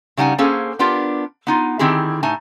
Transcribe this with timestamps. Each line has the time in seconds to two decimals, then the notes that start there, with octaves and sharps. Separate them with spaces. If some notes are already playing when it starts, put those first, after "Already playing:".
0.17 C#3 G3 D#4 F#5 G#5
0.38 A#3 C#4 G#4 A4 C5 F5
0.79 B3 D4 F4 G4 A#4
1.47 B3 D#4 F4
1.79 D3 D#3 C4 E4 G4 G#4
2.23 A2 D#4 G#5 A5